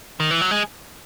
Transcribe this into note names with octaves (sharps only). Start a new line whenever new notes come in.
D#3
E3
F#3
G#3